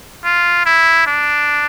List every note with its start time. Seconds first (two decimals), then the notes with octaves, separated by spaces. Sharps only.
0.25 F4
0.66 E4
1.07 D4